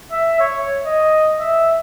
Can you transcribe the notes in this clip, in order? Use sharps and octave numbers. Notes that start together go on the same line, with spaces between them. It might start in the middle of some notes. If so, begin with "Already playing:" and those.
E5
C#5
D#5
E5